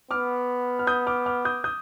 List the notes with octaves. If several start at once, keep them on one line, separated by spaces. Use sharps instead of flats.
B3 D6 F6
F6
D#6 G6
D6 F6
D6 F6
D#6 G6
D#6 G6